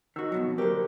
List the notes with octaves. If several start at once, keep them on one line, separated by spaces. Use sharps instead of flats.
D#3 F#4 D#5 E6
F2 B2 F#3
D3 A#3 G4 A#4 C5